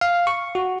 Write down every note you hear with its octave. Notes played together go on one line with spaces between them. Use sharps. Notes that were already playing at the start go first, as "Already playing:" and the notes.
F5
C#6
F#4